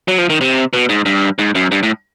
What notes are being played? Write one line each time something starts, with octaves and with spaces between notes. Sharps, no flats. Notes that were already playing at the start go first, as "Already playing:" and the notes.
F#3
F3
D#3
C3
B2
G#2
G2
G#2
F#2
G2
A2